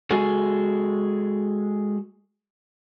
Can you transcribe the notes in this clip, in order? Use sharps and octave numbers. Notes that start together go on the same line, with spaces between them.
G#3 F#4 G#4 A4